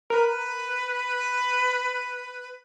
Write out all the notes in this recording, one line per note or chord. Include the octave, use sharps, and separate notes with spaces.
A#4 B4